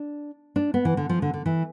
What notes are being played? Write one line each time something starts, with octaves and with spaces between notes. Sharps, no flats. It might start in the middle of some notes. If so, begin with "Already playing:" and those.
Already playing: D4
D4
B3
E3
D3
F3
D3
D3
E3